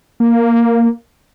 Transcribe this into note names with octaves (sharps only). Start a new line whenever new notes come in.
A#3